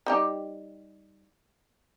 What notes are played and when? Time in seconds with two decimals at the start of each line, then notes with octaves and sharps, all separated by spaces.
0.06 G3 D#4 G4